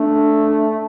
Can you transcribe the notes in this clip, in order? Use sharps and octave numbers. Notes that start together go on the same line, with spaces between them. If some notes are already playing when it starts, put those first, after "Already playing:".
Already playing: A3 D4